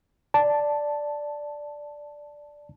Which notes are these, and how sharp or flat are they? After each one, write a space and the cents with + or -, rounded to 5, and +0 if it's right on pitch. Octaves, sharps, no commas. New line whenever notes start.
D5 +0 A5 +0